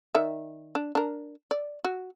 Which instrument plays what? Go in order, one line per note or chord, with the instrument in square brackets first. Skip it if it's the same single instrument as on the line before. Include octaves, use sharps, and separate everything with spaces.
[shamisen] D#3 D5 E5
D4
D4 A#4
D5
F#4